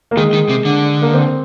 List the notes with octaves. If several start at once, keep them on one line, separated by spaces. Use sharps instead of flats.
A#3
D#3 G#3
D#3
C3
D3
A#3
C4